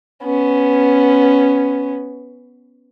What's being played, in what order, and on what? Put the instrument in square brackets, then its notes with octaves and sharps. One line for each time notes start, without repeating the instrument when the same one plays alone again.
[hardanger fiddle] B3 C#4